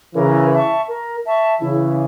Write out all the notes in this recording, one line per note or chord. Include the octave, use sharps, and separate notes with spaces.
C#3 E3 A#4
E5 A5 C#6
A#4
E5 A5 C#6
C#3 E3 E4